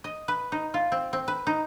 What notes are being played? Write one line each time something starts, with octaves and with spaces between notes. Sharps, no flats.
D#5
B4
D#4
F4
C4
C4
B4
D#4